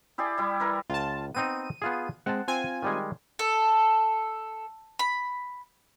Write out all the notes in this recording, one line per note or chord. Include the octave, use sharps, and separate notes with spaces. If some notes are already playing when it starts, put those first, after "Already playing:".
E4 G4 G#4 D5
G3 E4
E3 A#4
C#2 F4 A5
B3 C4 D#4 D#7
B3 F4 G#4
G#3 C4 F#5 A5
C4 F4 G#5
D#3 G3 G#3
A4
B5